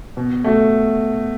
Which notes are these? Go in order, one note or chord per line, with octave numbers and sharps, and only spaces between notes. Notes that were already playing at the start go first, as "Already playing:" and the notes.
B2
A3 F#4 A4